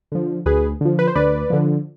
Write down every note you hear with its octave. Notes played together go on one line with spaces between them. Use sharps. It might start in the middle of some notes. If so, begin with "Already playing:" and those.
D3 F3
D2 G#4 B4
D3 F3
B4
C5
D2 B4 D5
D3 F3